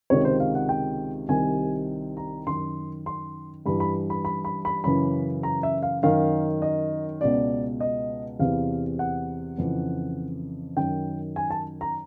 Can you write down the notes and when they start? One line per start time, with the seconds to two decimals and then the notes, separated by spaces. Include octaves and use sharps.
0.10 C#2 C3 D#3 C#5
0.25 C5
0.40 F5
0.55 F#5
0.69 G5
1.28 C2 C3 D#3 G#5
2.17 A#5
2.47 F#2 D#3 C6
3.06 C6
3.66 G2 E3 B5
3.80 B5
4.10 B5
4.25 B5
4.45 B5
4.65 B5
4.84 F#2 C#3 E3 B5
5.43 A#5
5.63 E5
5.83 F5
6.03 F#2 D#3 F5
6.62 D#5
7.21 C#2 B2 D5
7.80 D#5
8.39 E2 C3 E3 F5
8.99 F#5
9.58 F2 C#3 E3
10.77 F#2 D#3 G5
11.36 G#5
11.50 A5
11.81 A#5